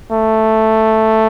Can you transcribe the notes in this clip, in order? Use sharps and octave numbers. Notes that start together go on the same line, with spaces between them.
A3